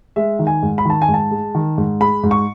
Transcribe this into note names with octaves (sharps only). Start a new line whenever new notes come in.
G#3 E5
D#3
G#5
G#2
B5
D#3 A5
G#5
G#2
A5
G#3
D#3
G#2
G#3 B5
G#2
C#6